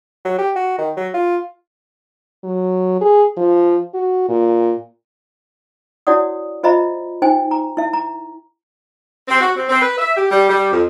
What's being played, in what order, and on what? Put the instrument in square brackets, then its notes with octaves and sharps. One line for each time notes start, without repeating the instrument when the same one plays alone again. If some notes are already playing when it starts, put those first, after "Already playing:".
[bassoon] F#3
G4
F#4
D#3
F#3
F4
[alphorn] F#3
G#4
F3
F#4
A#2
[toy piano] E4 F#4 C#5 D5 F#5 D#6
F4 C5 D#5 E5 A#5 B5
D#4 C5 G5 G#5
A#5
E4 E5
A#5
[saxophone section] C4
F#4
C4
C4
B4
E5
G4
G3
G3
F2